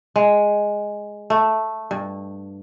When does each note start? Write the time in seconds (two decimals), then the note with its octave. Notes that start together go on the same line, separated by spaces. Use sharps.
0.16 G#3
1.30 A3
1.91 G2